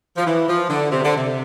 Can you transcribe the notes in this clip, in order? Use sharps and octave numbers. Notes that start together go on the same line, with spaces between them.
F3
E3
F3
D3
C3
D3
C3